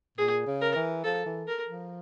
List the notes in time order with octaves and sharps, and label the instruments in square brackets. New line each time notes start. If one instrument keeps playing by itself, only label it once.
[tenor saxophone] A#2 [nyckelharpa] G#4
[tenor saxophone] C#3
[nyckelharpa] A#4
[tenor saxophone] E3
[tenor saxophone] F3 [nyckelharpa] A4
[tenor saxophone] E3
[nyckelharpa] A#4
[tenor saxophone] F3